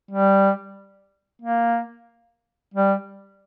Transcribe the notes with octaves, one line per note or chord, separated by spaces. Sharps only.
G3
A#3
G3